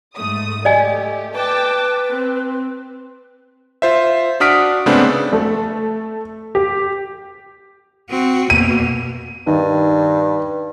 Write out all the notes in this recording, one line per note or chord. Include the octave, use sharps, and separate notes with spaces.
G#2 A3 D#6
A3 G4 D5 D#5 G#5
B4 G5 A5 D6
C4
F4 C5 E5
D4 F#4 D#6 F6 B6 D7
G#2 C#3 A3 B3 C4 D4
A3
G4
C4 F#4
B2 A#3 D#7
G2 D#3